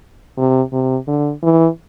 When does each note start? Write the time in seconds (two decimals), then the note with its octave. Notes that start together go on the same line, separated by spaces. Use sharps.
0.38 C3
0.73 C3
1.08 D3
1.43 E3